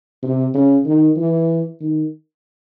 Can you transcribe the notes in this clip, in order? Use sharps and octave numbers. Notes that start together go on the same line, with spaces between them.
C3
C#3
D#3
E3
D#3